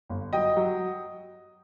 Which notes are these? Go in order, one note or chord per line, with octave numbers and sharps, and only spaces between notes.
G1
F#3 D#5 G5
F#3